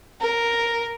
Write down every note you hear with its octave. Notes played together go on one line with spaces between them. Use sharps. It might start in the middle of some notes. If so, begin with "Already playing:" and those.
A#4